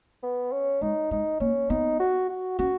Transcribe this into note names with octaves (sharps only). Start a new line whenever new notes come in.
B3
C#4
G#3 D#4
G#3 D#4
A#3 C#4
B3 D#4
F#4
F#4
C#4 F#4